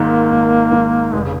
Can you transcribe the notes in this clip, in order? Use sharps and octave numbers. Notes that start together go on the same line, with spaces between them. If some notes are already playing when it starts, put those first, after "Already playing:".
Already playing: G#1 G#2 D#3 A#3
G#1
G#2 D#3
F1 G#3
C#3